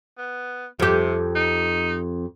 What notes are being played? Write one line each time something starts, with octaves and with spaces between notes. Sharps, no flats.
B3
F2 C3 G4
D#4